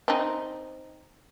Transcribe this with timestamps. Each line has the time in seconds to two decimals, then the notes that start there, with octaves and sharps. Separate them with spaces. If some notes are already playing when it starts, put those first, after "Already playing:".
0.08 C4 D#4